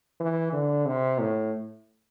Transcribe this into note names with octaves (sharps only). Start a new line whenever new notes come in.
E3
D3
C3
A2